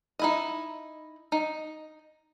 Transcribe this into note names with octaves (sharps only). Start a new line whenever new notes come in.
D#4 E4 D#5
D#4